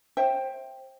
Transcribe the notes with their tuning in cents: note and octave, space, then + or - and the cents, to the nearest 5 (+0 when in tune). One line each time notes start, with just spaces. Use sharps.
C5 +25 E5 +0 G5 +0